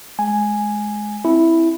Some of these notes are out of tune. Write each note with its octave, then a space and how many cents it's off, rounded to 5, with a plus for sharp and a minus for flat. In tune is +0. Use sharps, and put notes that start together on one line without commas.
G#3 +15 G#5 +0
C4 +0 E4 +0